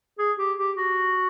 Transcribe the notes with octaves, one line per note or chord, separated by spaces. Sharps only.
G#4
G4
G4
F#4